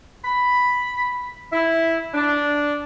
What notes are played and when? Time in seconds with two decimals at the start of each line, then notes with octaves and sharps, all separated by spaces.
0.25 B5
1.53 E4
2.13 D4